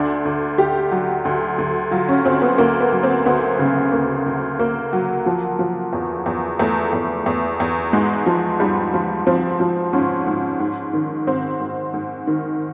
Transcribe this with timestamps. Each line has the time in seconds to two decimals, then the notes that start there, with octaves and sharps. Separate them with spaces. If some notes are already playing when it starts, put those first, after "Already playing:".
Already playing: D2 D4
0.25 D2
0.58 D2 G4
0.92 F#3
1.25 D2
1.58 D2
1.91 F#3 F4
2.09 C#4
2.25 D2 C4
2.42 B3
2.58 D2 A#3
2.80 B3
2.92 F#3
3.03 C4
3.26 D2 B3
3.59 C#3
3.92 D2 A#3
4.26 D2
4.59 D2 A#3
4.93 F#3
5.26 F3
5.59 F3
5.93 E2
6.26 E2
6.59 E2 A3
6.93 E2
7.26 E2
7.60 E2
7.93 G#2 G#3
8.26 F3
8.60 G#2 G3
8.94 F3
9.26 F3 C4
9.60 F3
9.93 G#2 C#4
10.27 G#2
10.60 G#2
10.93 D#3
11.27 G#2 C4
11.60 G#2
11.94 G#2
12.27 D#3